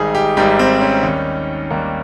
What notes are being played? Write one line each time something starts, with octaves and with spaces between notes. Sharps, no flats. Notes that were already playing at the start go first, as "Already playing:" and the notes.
Already playing: G#1 G#2 D#3 G3 D#4 G#4
G4
G#1 G#2 D#3 G3 G4
C4
C#4
D#2 D#3 G3
D#2 D#3 G3 A#3